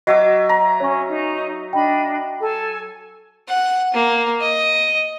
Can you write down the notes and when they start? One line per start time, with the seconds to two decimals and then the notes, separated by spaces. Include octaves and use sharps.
0.07 F#3 D#5 E5 D6
0.49 A#5
0.80 C#4 C#5 C#6
1.08 D#4
1.73 D4 D#5 G5 B5
2.41 A4 G#5
3.48 F#5
3.94 A#3
4.41 D#5